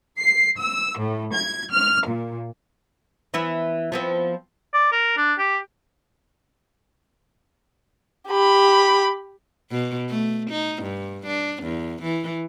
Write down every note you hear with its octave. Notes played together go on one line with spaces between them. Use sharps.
C7
E6
A2
G#6
F6
A#2
E3 B3 E4
F3 B3 C4
D5
A#4
D4
G4
G4 B5
B2
A3
D#4
G2
D4
E2
E3